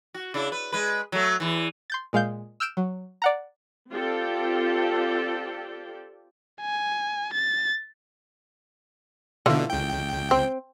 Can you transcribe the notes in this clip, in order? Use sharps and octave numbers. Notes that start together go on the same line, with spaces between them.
F#4
C#3 D4 E4
B4
G#3 B4
F#3 A3
E2 E3
C6 G6 A6
A#2 G#3 F5 G6
E6 F6 G6 D7 E7
F#3
D5 F#5 A#5
C4 F4 G4 A4 D5 G5
G#5
A6
B2 D3 E3 A3 F4
C#2 G5
C4